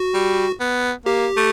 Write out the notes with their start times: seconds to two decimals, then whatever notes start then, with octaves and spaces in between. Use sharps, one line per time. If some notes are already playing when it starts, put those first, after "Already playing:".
Already playing: F#4
0.14 G3
0.60 B3
1.06 A#3 G4
1.37 A3